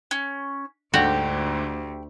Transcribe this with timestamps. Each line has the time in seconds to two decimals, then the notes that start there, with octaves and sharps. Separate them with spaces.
0.11 C#4
0.94 D2 G#2 D3 F#4 G4